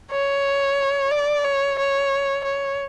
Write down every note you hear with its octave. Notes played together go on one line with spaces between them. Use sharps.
C#5
D5
C#5
C#5
C#5